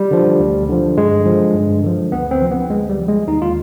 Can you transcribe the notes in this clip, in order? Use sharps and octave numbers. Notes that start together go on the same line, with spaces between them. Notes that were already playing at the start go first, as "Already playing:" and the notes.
Already playing: G3
D3 F3
D2
D3 F3
G2 G#3
D3 F3
G2
D3 F3
D2 B3
C4
D3 F3
B3
D2 G#3
G3
D3 F3
G#3
D#2 D#4
F4